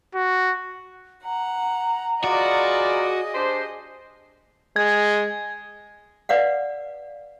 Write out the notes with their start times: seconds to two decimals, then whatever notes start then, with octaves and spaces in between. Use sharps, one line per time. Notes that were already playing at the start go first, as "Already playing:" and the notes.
0.15 F#4
1.24 F#5 A#5
2.24 F4 F#4 G#4 B4 D5 D#5
3.35 D4 G4 C5
4.76 G#3 G#6
6.29 B4 D5 F5 F#5